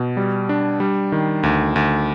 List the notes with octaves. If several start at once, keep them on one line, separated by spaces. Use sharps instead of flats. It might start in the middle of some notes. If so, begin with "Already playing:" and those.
Already playing: B2
G3
D4
G3
D#3
D2
D2